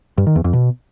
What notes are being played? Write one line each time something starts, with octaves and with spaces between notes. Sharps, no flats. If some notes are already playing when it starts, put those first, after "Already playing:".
G2
D#3
E2
F2
B2